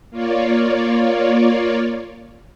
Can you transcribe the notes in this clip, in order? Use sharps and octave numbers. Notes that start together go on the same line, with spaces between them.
A#3 F4 C#5 D5